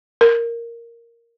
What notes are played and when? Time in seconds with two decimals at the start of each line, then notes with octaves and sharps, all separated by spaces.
0.21 A#4